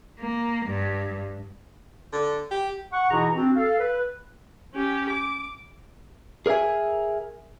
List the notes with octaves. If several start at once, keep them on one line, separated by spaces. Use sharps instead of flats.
A#3
G2
D3
G4
F#5 C#6
B2 E3 D#4 E4 G#4 A#5
C4 D4 F#4
A4 F5
B4
C#4 G4
D6
G#4 A#4 D5 E5 G#5